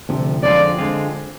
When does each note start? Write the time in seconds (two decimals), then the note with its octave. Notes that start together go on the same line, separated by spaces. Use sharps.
0.09 D2 C3 F3
0.43 F2 D3 G#3 C4 F4 D5
0.78 D3 G#3 C4 F4